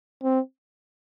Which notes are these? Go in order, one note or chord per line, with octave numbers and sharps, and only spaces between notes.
C4